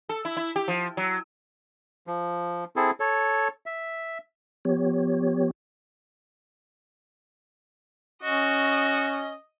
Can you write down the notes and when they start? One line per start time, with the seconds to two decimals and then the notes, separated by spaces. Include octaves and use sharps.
0.09 A4
0.25 E4
0.37 E4
0.56 G4
0.68 F3
0.97 F#3
2.07 F3
2.76 C4 E4 G#4 A4
3.00 A4 C#5
3.66 E5
4.65 F3 B3 G4 C#5
8.23 C#4 F#4 D#5